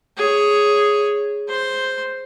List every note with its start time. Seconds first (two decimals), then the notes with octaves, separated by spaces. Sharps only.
0.17 G#4 C#5
1.48 C5 C6